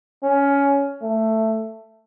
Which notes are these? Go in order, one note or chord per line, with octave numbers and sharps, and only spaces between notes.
C#4
A3